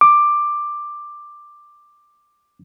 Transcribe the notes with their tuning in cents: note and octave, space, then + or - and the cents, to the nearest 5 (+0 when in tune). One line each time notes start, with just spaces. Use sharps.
D6 +10